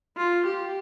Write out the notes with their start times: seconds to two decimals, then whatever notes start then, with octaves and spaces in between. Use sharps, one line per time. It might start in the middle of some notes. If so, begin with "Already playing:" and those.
0.17 F4
0.46 G4